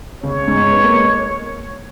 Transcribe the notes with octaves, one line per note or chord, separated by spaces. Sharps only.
C#2 C#3 C#5
G#2 G#3
B3
A#3
G#3